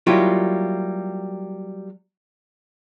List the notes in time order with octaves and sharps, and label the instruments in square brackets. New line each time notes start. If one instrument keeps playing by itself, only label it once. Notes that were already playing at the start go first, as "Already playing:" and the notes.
[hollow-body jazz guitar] F#3 G3 A#3 E4 F4 G4